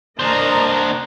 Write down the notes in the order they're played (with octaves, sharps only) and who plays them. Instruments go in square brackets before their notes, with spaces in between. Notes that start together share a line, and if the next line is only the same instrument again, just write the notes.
[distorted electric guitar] D4 C5 [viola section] A#4 D#5 A#5